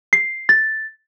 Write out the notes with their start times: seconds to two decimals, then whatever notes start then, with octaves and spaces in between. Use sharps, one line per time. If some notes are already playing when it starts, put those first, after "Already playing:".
0.13 C7
0.49 A6